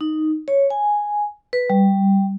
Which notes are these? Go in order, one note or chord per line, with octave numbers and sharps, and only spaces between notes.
D#4
C#5
G#5
B4
G3